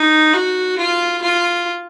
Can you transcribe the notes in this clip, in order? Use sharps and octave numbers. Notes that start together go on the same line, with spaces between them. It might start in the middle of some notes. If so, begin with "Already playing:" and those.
Already playing: D#4
F#4
F4
F4